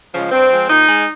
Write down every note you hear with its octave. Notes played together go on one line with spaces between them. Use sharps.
C#3 F3 G#3
G2 C4
F3 G#3
A#2 D#4
G#3